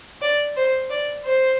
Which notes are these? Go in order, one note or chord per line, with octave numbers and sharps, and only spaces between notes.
D5
C5
D5
C5